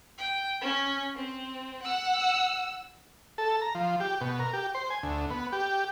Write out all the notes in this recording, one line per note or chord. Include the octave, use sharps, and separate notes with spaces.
G5
C#4
C4
F#5 E6
A4
A#5
F3
G4
B2
A#4
G4
C5
G#5
D2
B3
G4